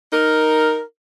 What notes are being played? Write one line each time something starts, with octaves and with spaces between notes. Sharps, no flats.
D#4 A#4